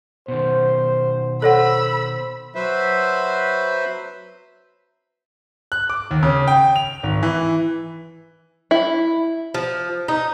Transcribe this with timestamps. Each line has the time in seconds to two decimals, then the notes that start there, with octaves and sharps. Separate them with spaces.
0.28 B2 D#3 C5
1.42 A4 C5 C#5 F#5 B5 E6
2.55 F#3 B4 C5 E5
5.72 F#6
5.89 D6
6.11 D#2
6.23 C#3
6.48 G5
6.76 F7
7.03 G#1
7.23 E3
8.71 E4
9.54 F3
10.08 D#4